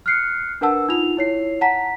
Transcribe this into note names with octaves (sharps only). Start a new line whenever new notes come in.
F6 F#6 C7 C#7
D4 A#4 B4 F#5 A5 E6
D#4 F4 F7
E4 C#5 C7
F#5 A5 A#5 B6